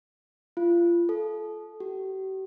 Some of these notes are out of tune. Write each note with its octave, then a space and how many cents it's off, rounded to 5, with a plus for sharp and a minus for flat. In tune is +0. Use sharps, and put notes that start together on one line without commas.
F4 -30
A4 -30
G4 -45